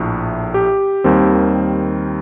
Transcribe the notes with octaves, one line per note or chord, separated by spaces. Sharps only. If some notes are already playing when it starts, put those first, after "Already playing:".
Already playing: A#1 A2 A3
G4
D#2 D#3 G3 C4